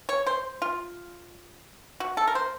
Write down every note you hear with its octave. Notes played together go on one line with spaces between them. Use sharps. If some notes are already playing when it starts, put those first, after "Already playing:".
C#5
C5
F4
F#4
A4
A#4
C5